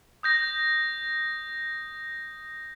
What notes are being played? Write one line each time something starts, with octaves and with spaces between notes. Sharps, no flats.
D#6 G6 A#6